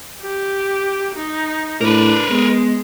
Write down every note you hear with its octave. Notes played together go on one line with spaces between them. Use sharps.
G4
D#4
A2 D4 A#4 B4
G#3 B3